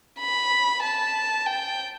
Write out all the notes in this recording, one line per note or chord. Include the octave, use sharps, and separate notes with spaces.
B5
A5
G5